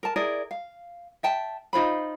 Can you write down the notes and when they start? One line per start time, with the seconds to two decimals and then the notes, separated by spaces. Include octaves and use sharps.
0.03 A#4 A5
0.16 E4 G#4 A#4 D5
0.51 F5
1.23 E5 G5 A5
1.73 D#4 F4 C5 B5